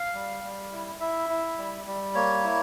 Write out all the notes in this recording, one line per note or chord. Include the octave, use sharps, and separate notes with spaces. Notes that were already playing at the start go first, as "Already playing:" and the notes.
Already playing: F5
G3
G3
E4
E4 E5
E4
G3
G3
A#3 C#5
E4